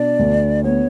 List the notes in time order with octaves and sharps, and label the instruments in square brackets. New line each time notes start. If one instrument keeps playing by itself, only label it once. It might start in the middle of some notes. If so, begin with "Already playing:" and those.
Already playing: [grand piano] B2 D4 [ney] D5
[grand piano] D2
[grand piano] B3 [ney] C#5